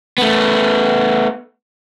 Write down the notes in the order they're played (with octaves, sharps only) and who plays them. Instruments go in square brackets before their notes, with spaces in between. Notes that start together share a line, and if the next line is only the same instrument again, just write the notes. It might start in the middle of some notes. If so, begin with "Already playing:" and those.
[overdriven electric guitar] A3 B3